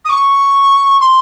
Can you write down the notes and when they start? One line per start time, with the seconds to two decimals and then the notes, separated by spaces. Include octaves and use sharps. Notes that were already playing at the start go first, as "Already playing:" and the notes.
0.05 D#6
0.09 C#6
1.00 C6